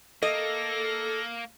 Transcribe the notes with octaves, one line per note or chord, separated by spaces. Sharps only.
A#3 A4 D#5 A#6